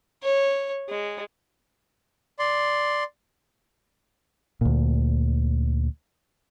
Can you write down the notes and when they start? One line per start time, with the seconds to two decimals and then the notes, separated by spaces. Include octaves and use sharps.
0.23 C#5
0.89 G#3
2.39 D5 C6
4.61 D2 A#2